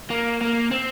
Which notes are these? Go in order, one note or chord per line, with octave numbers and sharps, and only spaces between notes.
A#3
A#3
C4